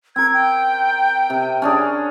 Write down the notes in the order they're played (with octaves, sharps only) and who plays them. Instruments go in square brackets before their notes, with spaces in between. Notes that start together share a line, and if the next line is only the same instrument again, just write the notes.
[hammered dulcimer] C4 A#4 [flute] G#6
[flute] G5
[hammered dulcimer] C3
C#4 D4 G#4